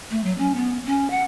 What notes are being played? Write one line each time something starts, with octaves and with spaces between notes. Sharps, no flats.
A3
F#3
C#4
B3
C#4
F#5